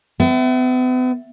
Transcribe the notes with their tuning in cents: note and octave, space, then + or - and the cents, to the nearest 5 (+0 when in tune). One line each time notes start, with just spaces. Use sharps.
B3 +40 E5 +0